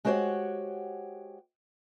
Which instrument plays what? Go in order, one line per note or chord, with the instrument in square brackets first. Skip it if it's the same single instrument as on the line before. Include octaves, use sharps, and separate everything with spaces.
[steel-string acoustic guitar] G#3 F#4 G4 C5 C#5 F#5